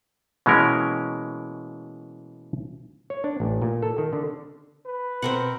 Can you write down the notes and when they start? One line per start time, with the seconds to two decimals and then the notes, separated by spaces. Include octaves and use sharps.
0.46 B2 E3 G#3 A#3 C#4 A#4
3.10 C#5
3.24 D4
3.40 A1
3.62 A#2
3.83 A4
3.98 D#3
4.13 D3
4.86 B4
5.22 B2 C4 A#4 F#5